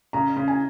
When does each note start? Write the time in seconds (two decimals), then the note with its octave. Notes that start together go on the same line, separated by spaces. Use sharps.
0.13 C#3 A#5
0.37 C#3
0.48 G#5